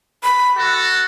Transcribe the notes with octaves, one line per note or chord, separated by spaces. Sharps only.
B5
F#4 A4